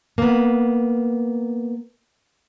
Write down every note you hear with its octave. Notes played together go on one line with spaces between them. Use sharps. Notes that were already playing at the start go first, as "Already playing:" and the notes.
A#3 B3